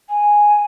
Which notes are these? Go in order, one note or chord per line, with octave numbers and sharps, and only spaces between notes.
G#5